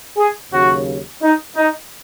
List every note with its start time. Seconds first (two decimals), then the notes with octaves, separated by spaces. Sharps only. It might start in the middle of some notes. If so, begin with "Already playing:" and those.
0.17 G#4
0.51 D#2 C#3 F#3 F#4
1.21 D#4
1.56 D#4